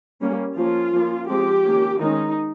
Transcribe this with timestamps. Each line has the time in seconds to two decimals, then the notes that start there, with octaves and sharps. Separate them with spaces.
0.21 G3 A#3 C#4
0.56 F3 A#3 C#4 F4
0.93 F3 A#3 C#4
1.28 F3 G#3 C4 G4
1.64 D#3 A#3 C#4
2.00 D#3 G#3 C#4 D#4